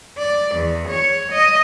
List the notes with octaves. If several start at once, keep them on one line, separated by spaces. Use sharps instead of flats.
D5
E2
C#5
D#5